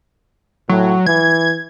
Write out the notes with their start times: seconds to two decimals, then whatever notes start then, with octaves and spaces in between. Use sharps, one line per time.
0.69 A2 F#3
1.07 E3 G#6